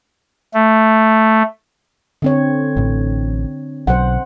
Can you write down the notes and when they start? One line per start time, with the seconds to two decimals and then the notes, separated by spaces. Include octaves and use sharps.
0.54 A3
2.22 D3 C4 C#5
2.77 A1 A2
3.87 B1 B2 F#3 C5 F#5